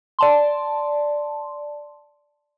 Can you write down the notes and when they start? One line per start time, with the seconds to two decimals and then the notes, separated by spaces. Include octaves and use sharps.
0.19 D5 A5 C6